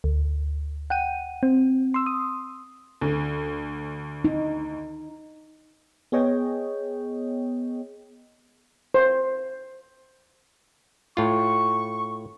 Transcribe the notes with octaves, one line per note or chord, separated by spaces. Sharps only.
D2
F#5 G5 D#7
C4
C6 E6
D#6
D2
D#4
B3 G#4 C#5 D#5 G5
C5
A2 F4 C#6